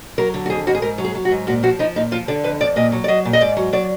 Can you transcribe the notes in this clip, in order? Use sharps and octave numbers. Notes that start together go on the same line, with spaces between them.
F#3 A#4
D3
F#4
F2 G#4
F2 F#4
G#4
G#2 A#4
F#3
G#4
F#3
F#4
G#2
A#2 F#4
F3 F#4
F3 D#4
A#2 D#4
F3 F4
D3 D5
F2 B4
F2 D5
A#2 D#5
F#3
D5
F#3 D#5
A#2
D#5
G#2 D5
F#3
F#3 D5